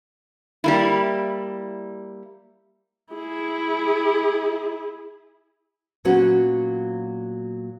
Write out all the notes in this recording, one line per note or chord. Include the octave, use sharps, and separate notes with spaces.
G3 A#3 E4
E4 G#4
A#2 F#3 B3 C#4 F#4